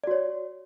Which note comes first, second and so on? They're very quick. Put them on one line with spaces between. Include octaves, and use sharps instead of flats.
D5 F#4 C#5